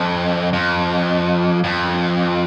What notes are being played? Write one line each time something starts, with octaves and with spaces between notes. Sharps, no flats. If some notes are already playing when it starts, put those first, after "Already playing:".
Already playing: F2
F2
F2